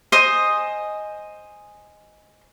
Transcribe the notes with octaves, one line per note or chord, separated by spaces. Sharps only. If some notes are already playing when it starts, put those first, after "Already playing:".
C5 D#5 G#5 D#6